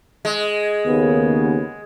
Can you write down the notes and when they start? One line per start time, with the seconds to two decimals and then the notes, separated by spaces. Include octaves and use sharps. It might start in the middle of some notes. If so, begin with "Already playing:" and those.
0.25 G#3
0.86 D#2 C#3 B3